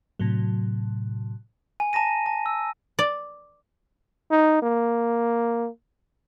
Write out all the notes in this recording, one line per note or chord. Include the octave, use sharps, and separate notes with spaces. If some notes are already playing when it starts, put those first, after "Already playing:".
A2 C3 F#3
G#5
A5 A#5 A#6 D#7
A5
E6
D5
D#4
A#3